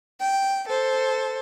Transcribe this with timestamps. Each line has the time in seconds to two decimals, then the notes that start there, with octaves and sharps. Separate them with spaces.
0.20 G5
0.68 A4 C5